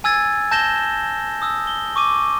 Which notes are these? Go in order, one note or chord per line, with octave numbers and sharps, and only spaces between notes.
G#5 E6 G#6 A6
A5 G6 A#6 E7 G7
D#6 E6
G7
C#6 D6 D#7